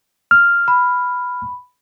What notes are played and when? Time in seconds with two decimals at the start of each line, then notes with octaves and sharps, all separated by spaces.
0.31 F6
0.68 B5